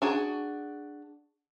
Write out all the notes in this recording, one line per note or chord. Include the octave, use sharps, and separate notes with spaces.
D4 F#4 G#4